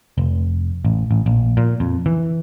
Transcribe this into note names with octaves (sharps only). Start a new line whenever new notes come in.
F1
A1
A1
A#1
A#2
F2
E3